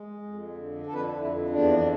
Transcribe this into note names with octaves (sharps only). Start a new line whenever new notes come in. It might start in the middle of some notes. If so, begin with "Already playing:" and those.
Already playing: G#3
F2
D3
F2 A4
B4
A4
F2 E4
E2 D4